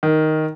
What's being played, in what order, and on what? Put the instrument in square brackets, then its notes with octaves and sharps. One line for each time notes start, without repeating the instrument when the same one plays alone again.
[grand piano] D#3